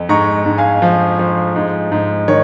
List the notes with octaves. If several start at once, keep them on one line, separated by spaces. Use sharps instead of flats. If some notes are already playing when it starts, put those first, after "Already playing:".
Already playing: F2
G#2 A#5 C#6
G#2
F5 G#5
F3
F3
G#2
G#2
D#3 C#5